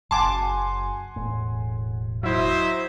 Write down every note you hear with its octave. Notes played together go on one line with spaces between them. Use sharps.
F#1 F#2 F#5 G#5 A5 C6 D6
E1 A2
F#3 E4 C5 D#5 E5